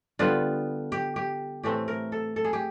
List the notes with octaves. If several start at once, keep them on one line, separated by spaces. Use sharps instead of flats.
D3 G3 B3 F4
G4
G4
A2 E3 A3 C4 G4
A#4
A4
A4
G#4
G4